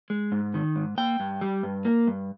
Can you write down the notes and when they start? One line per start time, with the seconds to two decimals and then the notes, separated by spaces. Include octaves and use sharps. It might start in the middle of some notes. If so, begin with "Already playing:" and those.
0.10 G#3
0.32 G#2
0.54 D#3
0.76 G#2
0.98 A#3 G5
1.20 G2
1.41 G3
1.63 G2
1.85 A#3
2.07 G2